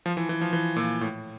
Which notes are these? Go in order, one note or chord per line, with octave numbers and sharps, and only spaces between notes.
F3
E3
E3
F3
E3
A#2
A2